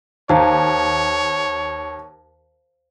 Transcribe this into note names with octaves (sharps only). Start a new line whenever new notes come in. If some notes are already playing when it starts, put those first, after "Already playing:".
D#2 C5 C#5 F5 A#5